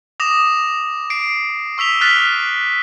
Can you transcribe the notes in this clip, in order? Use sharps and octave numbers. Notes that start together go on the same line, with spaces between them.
D6 D#6 A#6 E7 F7
C7 D7
C#6 E6 B6 F7 G7
F6 F#6 A6 B6 F7